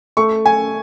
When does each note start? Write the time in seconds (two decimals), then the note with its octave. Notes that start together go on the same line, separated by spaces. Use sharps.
0.17 A3 C#6
0.46 G#5